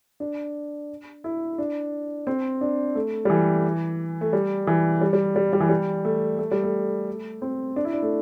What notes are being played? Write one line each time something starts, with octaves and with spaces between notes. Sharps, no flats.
D4
E4
D4
C4
D4
A3
G3
E3
A3
G3
E3
G3
G3
G3
G3
E3
G3
A3
A3
G3
A3
C4
D4
E4
D4
A3